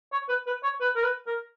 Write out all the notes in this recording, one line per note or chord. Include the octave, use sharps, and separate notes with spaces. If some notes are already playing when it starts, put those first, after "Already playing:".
C#5
B4
B4
C#5
B4
A#4
B4
A#4